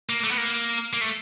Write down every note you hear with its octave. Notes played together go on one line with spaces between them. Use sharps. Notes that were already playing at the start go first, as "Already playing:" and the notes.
A#3
A3
B3
A#3
A#3
A3